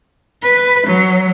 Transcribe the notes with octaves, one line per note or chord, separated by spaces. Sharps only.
B4
F#3